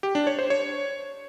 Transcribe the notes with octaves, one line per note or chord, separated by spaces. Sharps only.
G4
D4
C#5
C5
C#5